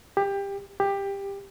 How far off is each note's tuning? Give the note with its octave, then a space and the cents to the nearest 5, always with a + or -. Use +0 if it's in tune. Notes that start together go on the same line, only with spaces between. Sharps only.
G4 +20
G4 +15